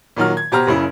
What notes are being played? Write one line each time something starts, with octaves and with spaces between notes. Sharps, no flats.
A#2 D#3 F#3 F6
G#6
B2 G4 C5 A#5 F6
F#1 C#3 E4